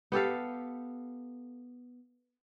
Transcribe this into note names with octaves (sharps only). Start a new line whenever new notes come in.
B3 G4 A4 F5